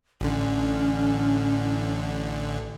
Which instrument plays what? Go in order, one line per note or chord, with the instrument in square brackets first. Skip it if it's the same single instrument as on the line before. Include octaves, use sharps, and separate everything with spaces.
[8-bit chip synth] A1 D3 [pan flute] C#4